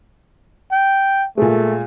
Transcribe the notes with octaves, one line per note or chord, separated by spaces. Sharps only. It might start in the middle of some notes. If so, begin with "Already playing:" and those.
G5
A#2 G#3 A3